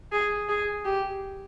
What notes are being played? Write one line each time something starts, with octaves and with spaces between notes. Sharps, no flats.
G#4
G#4
G4